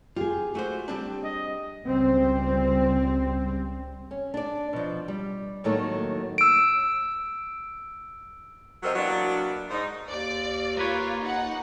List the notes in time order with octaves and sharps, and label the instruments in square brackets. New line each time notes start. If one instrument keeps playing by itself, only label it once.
[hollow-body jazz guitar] F4 [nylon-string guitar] G4 G#4
[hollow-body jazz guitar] A3 F#4 C5
G3 C4 D4
[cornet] D#5
[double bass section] C#2 G3 C4
[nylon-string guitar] C#4
D4 D5
B2 F3
G3
A2 D#3 F#3 A3 A#3
[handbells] E6 D7
[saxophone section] C3 F#3 C4 A4 A#4 D#5
E3 F#3 A#3 B3 D4
G#2 D#4
[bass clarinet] D#2 [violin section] D5
[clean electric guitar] A#3 B4 C#5 [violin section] F4
[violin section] D#4 F#5